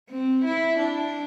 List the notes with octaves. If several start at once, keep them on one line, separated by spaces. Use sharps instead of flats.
C4
E4
D4